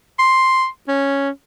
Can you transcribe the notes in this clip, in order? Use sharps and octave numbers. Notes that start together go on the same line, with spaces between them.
C6
C#4